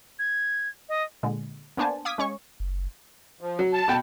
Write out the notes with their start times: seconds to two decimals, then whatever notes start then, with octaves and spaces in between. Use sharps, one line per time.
0.19 G#6
0.89 D#5
1.23 A#2 D3 G#3
1.77 A#3 B3 D4 C5 G#5 A5
2.05 F5 D6 D#6 G#6 B6
2.18 G#3 C#4 C#5 C#6
2.60 F#1
3.41 F3
3.59 F#3
3.73 A5
3.88 B2 G5